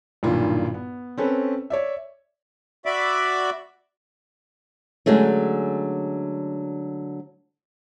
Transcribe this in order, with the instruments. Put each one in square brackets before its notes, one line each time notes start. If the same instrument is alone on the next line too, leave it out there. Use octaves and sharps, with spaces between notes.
[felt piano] B1 G2 A#2 D#3 E4 F4
B3
C4 C#4 A4 B4
C#5 D5 E5
[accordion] F#4 D5 E5 B5 D6
[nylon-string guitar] D3 F#3 G#3 A3 C#4